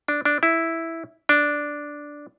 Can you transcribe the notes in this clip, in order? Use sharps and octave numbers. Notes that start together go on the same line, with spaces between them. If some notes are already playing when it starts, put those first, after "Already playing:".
D4
D4
E4
D4